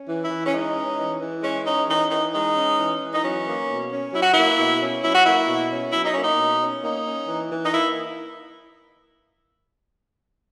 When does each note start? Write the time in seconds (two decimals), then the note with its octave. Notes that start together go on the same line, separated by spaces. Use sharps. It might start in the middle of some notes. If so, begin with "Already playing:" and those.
Already playing: C#4
0.09 E3
0.23 E4
0.30 E3
0.45 C#4
0.53 G#3 D#4
0.75 C#4
0.98 E3
1.20 E3
1.42 G#3 C#4
1.65 C#4 D#4
1.89 E3 D#4
2.10 E3 D#4
2.33 G#3 D#4
2.56 C#4
2.77 E3
3.00 E3
3.12 D#4
3.23 F#3 C#4
3.46 A#3
3.68 B2
3.90 C#4
4.13 F#3 E4
4.21 F#4
4.31 A#3 E4
4.58 B2
4.80 C#4
5.03 F#3 E4
5.13 F#4
5.25 A#3 E4
5.48 B2
5.70 C#4
5.92 F#3 E4
6.04 D#4
6.13 A#3 C#4
6.23 D#4
6.37 B2
6.61 C#4
6.83 A#3 D#4
7.06 C#4
7.28 E3
7.51 E3
7.64 D#4
7.73 A#3 E4